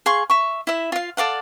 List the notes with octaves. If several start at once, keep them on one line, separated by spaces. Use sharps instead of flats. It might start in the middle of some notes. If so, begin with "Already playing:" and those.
G#4 F5 C6 C#6
E5 C#6
E4 E5
F4 F5
A4 D5 F5 F#5